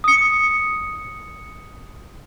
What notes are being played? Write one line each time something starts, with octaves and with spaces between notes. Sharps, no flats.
D#6 C#7